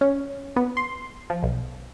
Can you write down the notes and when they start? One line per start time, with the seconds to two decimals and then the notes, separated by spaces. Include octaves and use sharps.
0.01 C#4
0.56 B3
0.77 C6
1.30 F3
1.43 B1